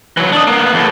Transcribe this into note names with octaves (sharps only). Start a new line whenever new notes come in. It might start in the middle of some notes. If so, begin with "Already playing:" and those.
E3 F#3
D4 D#5
A#3 B3
E2 A2